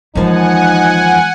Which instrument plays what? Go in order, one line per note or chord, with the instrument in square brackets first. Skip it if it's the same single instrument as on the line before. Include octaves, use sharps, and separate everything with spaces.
[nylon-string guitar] D#2 F3 [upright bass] E3 G#3 [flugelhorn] D#4 [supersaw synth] F#5 G#5